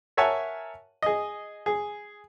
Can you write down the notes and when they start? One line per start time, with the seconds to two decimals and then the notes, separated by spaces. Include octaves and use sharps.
0.17 A#4 C#5 E5 F#5 G#5 A5
1.02 G#4 D#5
1.66 G#4